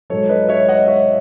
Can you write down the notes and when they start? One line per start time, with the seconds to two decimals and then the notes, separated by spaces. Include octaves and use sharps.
0.10 G#2 F#3 A4 C#5
0.29 B4 D#5
0.49 C#5 E5
0.69 D#5 F#5
0.87 C#5 E5